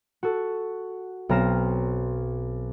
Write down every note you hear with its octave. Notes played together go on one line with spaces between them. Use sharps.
F#4 A4
B1 C4 A#5 F6 A#6 E7